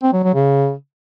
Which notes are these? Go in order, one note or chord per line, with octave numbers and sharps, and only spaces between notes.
C4
F#3
F#3
C#3